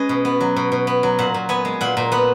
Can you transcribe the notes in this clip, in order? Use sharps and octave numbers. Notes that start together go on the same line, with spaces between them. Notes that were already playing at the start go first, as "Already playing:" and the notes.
Already playing: G#3 C#4 B4 C#5 D#5
B2
B3
F#3
B2
B2
B3
F#3
A#2 F#5
A#2
B3 G#5
G#3
A#2 F#5
A#2
B3 F#5